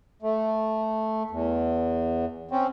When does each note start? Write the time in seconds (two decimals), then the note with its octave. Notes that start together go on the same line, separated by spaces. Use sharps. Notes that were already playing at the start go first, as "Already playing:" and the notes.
0.22 A3
1.30 E2
2.51 C4 C#4